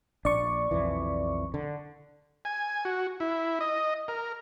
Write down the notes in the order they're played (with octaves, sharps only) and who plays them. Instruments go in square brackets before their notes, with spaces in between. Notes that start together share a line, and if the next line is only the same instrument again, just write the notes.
[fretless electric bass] A#1 D4 [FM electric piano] D5 C#6
[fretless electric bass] B1 F2 E3
D3
[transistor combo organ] G#5
F#4
E4
D#5
A#4